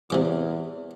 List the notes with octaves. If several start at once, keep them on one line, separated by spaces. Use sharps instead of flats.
E2 C3 E3 D6